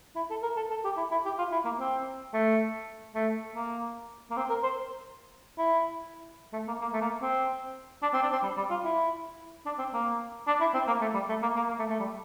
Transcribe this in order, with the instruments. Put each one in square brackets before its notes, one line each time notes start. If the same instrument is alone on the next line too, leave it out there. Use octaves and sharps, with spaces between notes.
[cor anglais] E4
A4
A#4
A4
A4
G4
E4
E4
G4
F4
E4
A#3
C4
A3
A3
A#3
A#3
C4
A#4
C5
E4
A3
A#3
A#3
A3
A#3
C4
D4
C4
D4
C4
G3
G3
F4
E4
D4
C4
A#3
D4
E4
C4
A#3
A3
G3
A3
A#3
A#3
A#3
A3
A3
G3